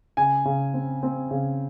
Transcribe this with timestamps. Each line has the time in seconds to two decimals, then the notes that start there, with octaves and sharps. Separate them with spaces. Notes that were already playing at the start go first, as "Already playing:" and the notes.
0.17 C#3 G#5
0.45 C#3
0.74 C4
1.03 C4
1.31 C#3